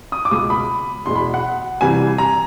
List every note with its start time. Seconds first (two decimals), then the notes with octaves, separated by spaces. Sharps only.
0.12 D#6
0.25 D6
0.31 C#2 B2 G#3 D#6
0.50 B5
1.06 E2 B2 G#3 C6
1.15 B5
1.34 F#5
1.81 C2 C3 E3 G3 G#5
2.18 A#5